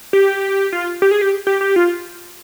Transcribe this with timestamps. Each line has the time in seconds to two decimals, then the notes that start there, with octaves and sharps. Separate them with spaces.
0.13 G4
0.73 F4
1.02 G4
1.11 G#4
1.22 G4
1.47 G4
1.61 G4
1.76 F4